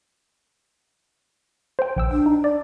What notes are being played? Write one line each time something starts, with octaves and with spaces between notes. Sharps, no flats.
C5 G5
A#1 G5 E6
D4 G5
D#4
D5